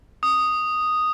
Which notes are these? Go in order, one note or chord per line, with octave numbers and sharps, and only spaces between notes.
D#6